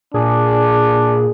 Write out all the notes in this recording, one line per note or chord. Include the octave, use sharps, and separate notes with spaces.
A#2 D4 G#4